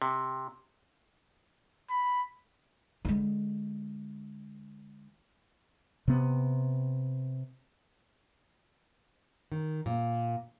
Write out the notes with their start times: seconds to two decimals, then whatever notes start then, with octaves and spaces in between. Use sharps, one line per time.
0.02 C3
1.90 B5
3.05 D3 G#3
6.08 C3 B3
9.52 D#3
9.86 A#2